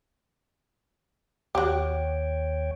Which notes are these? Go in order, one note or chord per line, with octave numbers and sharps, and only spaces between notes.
D#2 F#4 G4 C#5 G5